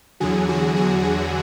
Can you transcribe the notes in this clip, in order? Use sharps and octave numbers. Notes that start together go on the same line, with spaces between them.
E2 D3 F#3 G#4
F#4
G#4
F#4